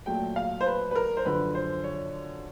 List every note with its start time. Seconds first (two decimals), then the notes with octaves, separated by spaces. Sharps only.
0.06 A#2 F#3 A3 G5
0.36 F5
0.61 C5
0.66 B4
0.91 B4
0.95 A#4
1.17 C5
1.25 F#2 D3 F3 B4
1.55 C5
1.84 C#5